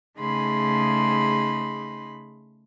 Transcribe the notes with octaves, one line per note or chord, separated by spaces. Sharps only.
C#3 A3 D#4 G#4 B5 C6